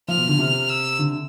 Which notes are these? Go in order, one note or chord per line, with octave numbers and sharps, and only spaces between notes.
F3 F6
B2
D3
C3
E6
D3